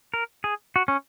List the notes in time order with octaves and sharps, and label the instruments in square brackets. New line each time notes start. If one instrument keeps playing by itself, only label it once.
[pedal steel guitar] A#4
G#4
F#4
C#4